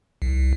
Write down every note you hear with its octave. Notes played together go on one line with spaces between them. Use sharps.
C2